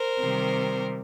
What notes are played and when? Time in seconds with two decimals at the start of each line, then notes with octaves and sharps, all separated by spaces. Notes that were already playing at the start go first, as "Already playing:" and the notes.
Already playing: A#4 C5
0.20 C3 D#3 G3